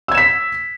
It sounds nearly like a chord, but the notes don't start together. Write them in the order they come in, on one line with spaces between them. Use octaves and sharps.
E6 G#6 E7 B6